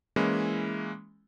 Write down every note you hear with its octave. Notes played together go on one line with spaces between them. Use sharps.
E3 G#3 A#3 C#4 E4